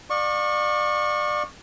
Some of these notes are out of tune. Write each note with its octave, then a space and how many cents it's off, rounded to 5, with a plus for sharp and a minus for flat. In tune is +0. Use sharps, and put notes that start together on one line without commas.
D5 +30 F5 +35 C#6 -15